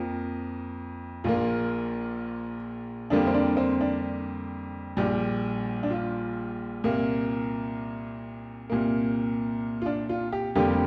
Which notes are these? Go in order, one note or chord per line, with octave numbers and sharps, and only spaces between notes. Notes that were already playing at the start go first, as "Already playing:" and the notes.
Already playing: F2 F3 A#3
A#1 A#2 A#3 F4
F2 D3 G3 A#3 D4
C4
D4
C4
D4
A#1 A#2 G3
D4
F4
C2 A#2 A#3
C2 A#2 A#3
F4
D4
F4
G4
F1 F2 D3 G3 A#3 G4